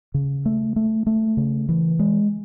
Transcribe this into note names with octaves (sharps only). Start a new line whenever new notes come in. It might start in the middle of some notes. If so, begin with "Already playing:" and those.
C#3
A3
A3
A3
C#3
E3
G#3